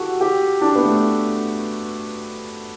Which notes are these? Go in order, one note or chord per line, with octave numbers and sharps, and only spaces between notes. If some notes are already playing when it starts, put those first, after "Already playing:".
Already playing: F#4 G4 A4
G4
D4
B3
A3